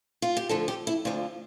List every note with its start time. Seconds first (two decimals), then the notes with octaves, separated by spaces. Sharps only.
0.22 F4
0.37 G4
0.49 D2 D3 F3 A4
0.68 G4
0.87 E4
1.05 D2 D3 F3 F4